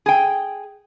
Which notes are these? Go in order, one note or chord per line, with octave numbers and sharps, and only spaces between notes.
G#4 G5